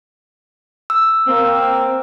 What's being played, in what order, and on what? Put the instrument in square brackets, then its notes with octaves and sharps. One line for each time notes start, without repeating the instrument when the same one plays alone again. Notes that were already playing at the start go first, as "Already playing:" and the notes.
[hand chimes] E6
[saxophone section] A#3 C4